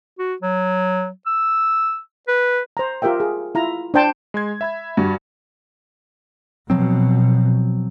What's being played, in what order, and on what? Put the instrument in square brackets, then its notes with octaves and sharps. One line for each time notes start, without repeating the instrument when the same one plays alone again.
[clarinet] F#4
F#3
E6
B4
[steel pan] C5 A#5
F4 G4 A#4 E5 G5
G#4
E4 F4 A#5
D4 C5 G5 A5
[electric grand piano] G#3 C6 G#6
E5 B5 G#6
[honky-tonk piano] G2 [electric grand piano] F#4
[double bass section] B2 [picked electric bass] F3 F#3 C4